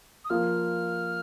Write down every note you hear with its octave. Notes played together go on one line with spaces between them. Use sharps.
D#6
F3 A#3 F4 F6